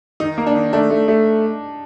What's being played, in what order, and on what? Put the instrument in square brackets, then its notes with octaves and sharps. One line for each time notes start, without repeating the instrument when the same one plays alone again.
[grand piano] D#3 [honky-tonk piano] D#4
[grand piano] A#3
[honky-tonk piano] D4
[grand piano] D#3
[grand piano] A3 [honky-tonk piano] D4
[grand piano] A3
A3